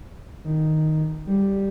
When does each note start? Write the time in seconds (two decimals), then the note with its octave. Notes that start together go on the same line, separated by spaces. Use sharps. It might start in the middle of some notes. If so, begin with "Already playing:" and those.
0.44 D#3
1.26 G3